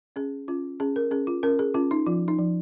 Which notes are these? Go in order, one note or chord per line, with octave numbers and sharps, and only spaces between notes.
C#4 G#4
C#4 F4
C#4 G#4
A#4
C#4 G#4
F4
C#4 A#4
G#4
C#4 F4
D#4
F3 F4
D#4
F3